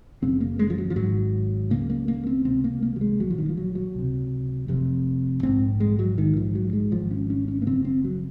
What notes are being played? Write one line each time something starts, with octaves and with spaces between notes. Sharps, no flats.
F#1 F#2 C#3 C4
A#3
G#3
F3
F#3
F3
G#1 G#2 F#3
C#2 C#3 A#3
A#3
A#3
C4
C#2 C3 C4
A#3
A#3
F#3
G#3
A#1 A#2 F#3
F3
D#3
F3
F#3
F#3
C#2 C3
F1 F2 C3
A#1 G#2 C4
G#3
F#3
A#1 G#2 D#3
F3
F#3
G#3
G#1 G#2 F3
C#4
C#4
C#4
A#3
F#1 F#2 C#3 C4
C4
F#3